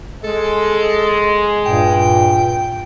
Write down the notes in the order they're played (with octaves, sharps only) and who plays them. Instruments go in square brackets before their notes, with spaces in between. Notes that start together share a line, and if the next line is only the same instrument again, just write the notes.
[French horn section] G#3 [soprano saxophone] A4
[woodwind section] G2 A#2 [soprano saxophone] G5